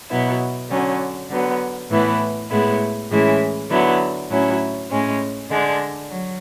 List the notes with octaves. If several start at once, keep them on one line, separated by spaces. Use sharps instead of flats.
B2 F#3 B3 E4
D3 F#3 C#4
D3 F#3 B3
A2 E3 B3 E4
A2 G#3 B3 E4
A2 E3 G#3 C#4 E4
D3 F#3 B3 E4
A2 F#3 C#4 E4
A2 G#3 C#4
D3 G#3 D4
F#3